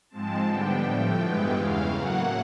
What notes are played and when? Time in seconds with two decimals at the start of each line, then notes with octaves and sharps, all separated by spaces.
0.10 G#2 F3 G#3 C4 A5
0.47 D3 G3 B3 D4 G5
0.83 A2 F3 A3
1.19 G2 E3 G#3 B3
1.55 E2 C#3 E3 F5
1.92 A2 F#3 A#3 F#5